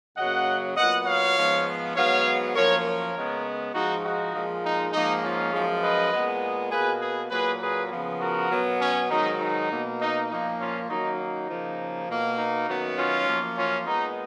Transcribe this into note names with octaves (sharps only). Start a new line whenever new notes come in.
F#2 C#3 F#3 A#3 D#5 F#5
A#2 F#3 B3 D#5 F#5
C#5 F5
G#2 F3 B3
G#2 F#3 B3 C#5 F5
F#2 F3 A#3 A#4 C#5
A#4 C#5
C#3 G#3 B3
G#2 F3 G#3 D#4 F#4
D#4 F#4
A#2 F3 G#3
D#4
G#2 F3 A#3 D#4
C#4 F4
F#2 F3 G#3
B4 D#5
A#2 G#3 B3
B2 A#3 G#4 B4
G#4 B4
A#2 F#3 A#3 G#4 B4
G#4 B4
C#3 F3 B3
F#4 A#4
B2 F#3 B3
C#4
G#2 D#3 F#3 D#4
D#4
B2 A#3
D#4
A#2 F3 A#3 D#4
C#4 F4
F#2 D#3 F#3 A#3 D#4
D#4
C#3 F3 A#3
B2 A#3
D#4
F#2 D#3 F#3 B3
C#4 F4
F#2 F3 A#3
C#4 F4
A#2 G#3 B3 D#4